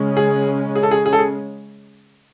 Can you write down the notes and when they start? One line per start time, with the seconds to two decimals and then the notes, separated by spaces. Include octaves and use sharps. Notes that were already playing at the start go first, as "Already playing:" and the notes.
Already playing: C#3 G#3 C#4
0.17 G#4
0.76 G#4
0.83 A4
0.91 G#4
1.06 G#4
1.13 A4
1.19 G#4